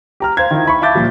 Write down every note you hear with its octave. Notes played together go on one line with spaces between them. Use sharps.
G4 A#5 F6
C5 F5 G#6
D#3 E4 F4
E5 B5 C#6
E5 F5 A5 D6 G6 A6
A#2 F3 G3